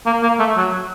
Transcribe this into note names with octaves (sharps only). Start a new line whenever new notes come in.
A#3
A#3
A3
F#3